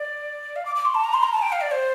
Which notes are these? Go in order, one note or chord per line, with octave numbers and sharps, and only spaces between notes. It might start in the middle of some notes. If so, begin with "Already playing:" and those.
Already playing: D5
F5
D6
D6
C6
A5
A#5
C6
A#5
A5
G5
F5
D5
C5